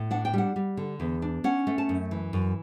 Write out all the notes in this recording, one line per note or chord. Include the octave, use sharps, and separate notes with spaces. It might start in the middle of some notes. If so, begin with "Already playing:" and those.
Already playing: A2
D4 F#5
G5
G3 F#5
G3
D3
E2
D4
C#4 F#5
A3
A5
F#2
E3
F#2